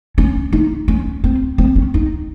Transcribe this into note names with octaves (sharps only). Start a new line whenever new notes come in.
C#4
D#4
C#4
C4
C4
C#4
D#4